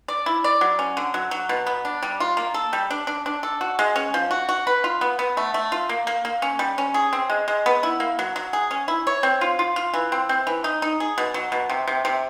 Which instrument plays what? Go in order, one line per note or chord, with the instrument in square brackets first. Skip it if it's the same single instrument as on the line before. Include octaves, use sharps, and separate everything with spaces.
[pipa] D5
E4
D5
F#3
C#4
D3
F#3
F#3
B2
B3
D4
G3
F4
A#3
A4
G3
D4
D4
D4
A4
F#4
G#3
C#4
F3
F#4
F#4
B4
F4
B3
B3
A3
A3
F4
A#3
A#3
A#3
C#4
G3
C#4
G#4
C4
G#3
G#3
B3
E4
A#3
F#3
F#3
G#4
C#4
E4
C#5
C4
F4
F4
F4
E3
C4
C4
E3
D#4
D#4
G#4
B2
F#3
B2
C3
C3
C3